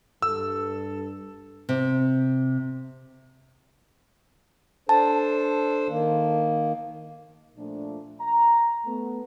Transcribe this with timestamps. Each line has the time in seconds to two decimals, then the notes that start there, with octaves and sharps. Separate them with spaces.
0.22 G2 A4 E6
1.69 C3
4.89 D4 A4 C5 A5
5.89 D#3 A#3
7.57 A#2 F3 A3 D4
8.21 A#5
8.86 A3 B3